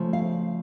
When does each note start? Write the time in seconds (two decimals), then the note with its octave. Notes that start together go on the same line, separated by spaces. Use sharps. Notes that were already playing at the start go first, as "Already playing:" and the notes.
Already playing: C#3 F3 A3
0.13 F5